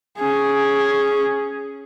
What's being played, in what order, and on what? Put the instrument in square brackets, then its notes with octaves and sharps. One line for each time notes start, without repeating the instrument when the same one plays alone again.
[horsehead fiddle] C#4 G#4